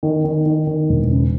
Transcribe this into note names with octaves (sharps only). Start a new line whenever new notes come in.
D#3
D#3
D#3
D#3
E1
C#3